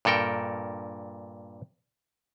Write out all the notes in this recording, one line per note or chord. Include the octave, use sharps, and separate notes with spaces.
G2 A#2 A4 A#4 G5